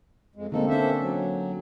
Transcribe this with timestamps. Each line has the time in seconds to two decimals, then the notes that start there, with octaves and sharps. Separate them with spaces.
0.36 F2 G#3
0.52 D3 G#3 A#3 C4 D#4 A4
0.69 C#4 D4 A4 C5 E5
1.00 F#3